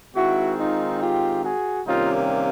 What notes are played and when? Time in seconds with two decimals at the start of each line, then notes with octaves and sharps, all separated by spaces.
0.14 D#3 G#3 C4 E4 F#4
0.58 D#4 F4
1.00 F4 G4
1.43 F#4 G#4
1.85 C3 D#3 G3 A#3 C#4 D#4 F4